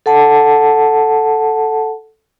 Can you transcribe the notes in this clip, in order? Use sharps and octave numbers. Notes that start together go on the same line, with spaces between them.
A4 F#5 A5